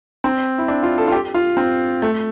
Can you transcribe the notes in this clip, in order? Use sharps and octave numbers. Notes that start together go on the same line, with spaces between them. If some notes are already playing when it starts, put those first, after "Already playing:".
C4
E4
D4
F4
A4
F4
G4
F4
C4
A3